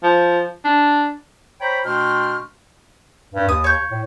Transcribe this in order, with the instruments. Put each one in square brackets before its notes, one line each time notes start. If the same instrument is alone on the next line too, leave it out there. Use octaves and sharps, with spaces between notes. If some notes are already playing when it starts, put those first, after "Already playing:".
[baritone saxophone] F3
D4
[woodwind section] C5 C#5 G5 A#5 B5
B2 A3 D4 G5 C6 F6
[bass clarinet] G2
[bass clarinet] D#2 [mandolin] D#6
[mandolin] C#5 G6
[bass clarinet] A2